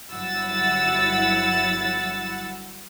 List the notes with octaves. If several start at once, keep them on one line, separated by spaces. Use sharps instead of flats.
G1 F#3 E4 F#5 E6 A6